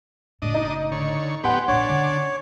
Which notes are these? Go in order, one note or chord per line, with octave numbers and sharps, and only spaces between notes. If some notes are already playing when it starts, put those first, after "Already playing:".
F#1 A2 D4 D#5
D#4
D3 C#5
A2 F3 B3 G4 F#5 G#5 C6
A#1 A#2 D4 C#5
D3 C#4